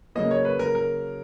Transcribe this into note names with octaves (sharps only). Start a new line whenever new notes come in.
C#3 F#3 A#3 D#5
C#5
B4
A#4
A#4